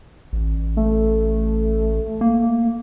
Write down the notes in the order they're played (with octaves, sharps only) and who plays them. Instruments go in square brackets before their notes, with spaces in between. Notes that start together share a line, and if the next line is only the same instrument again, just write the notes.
[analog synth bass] A1
[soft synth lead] A3
[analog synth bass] A#3